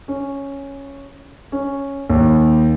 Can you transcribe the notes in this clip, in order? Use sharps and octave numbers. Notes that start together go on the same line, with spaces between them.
C#4
C#4
D#2